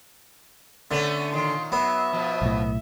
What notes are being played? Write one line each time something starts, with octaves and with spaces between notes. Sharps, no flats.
D3 A3 B3 C#4
A#2 D#3 C6
F#3 B3 E5
B2 F3
B1 A2